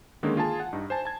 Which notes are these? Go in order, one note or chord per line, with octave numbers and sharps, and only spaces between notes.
D3 D#3 G#3 A#3 C#4 D#4
F4 G#4 G#5 A5
F#5
G2 D#4
C5 G#5 A5
A5 G#6